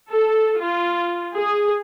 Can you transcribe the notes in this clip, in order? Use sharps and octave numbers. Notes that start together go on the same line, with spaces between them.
A4
F4
G#4